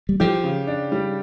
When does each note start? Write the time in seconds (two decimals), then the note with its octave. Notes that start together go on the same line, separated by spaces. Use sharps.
0.09 G3
0.20 F3 G4
0.44 C#3
0.67 D4
0.92 G3